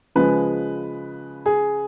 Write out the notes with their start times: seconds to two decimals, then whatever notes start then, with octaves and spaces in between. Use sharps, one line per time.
0.15 C#3 F3 G#3 B4
1.46 G#4